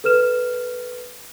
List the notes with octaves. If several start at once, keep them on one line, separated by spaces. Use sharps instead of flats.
A4 B4 F6 E7